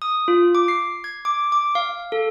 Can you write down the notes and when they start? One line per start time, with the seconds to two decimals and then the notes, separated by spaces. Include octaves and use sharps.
0.02 D#6
0.28 F4
0.55 D6
0.68 C7
1.04 G#6
1.25 D6
1.52 D6
1.75 F5
2.12 A4